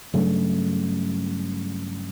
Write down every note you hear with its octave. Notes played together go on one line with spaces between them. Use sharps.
G2 C#3 F#3 A3